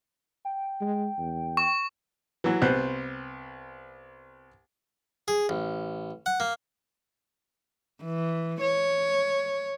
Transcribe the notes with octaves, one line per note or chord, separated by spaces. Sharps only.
G5
G#3
E2
C#6
E3 F#3
C2 B3 C5 F#6
G#4
A1
F#5
A#3
E3
C#5